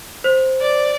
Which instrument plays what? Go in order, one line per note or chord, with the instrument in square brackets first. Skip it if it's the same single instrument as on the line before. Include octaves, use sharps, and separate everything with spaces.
[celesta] C5
[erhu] D5